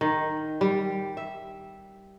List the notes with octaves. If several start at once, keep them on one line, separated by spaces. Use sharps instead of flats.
D#3
G3
E5